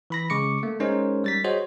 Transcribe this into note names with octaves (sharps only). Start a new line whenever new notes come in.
E3 B5 A#6
C#3 G#3 C#6 D6 C#7
A3 A#3
G#3 C#4 D#4 A#4 C5 C#5
G3 A6 B6
F#4 G#4 C5 C#5 D#5